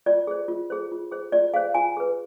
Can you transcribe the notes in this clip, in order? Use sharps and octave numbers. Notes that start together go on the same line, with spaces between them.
F4 D5
G#4 C5
F4
G#4 C5
F4
G#4 C5
F4 D5
G#4 C5 F5
F4 G#5
G#4 B4